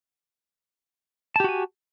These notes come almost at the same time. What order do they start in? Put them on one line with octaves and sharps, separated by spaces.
A5 G4 F#4 G#5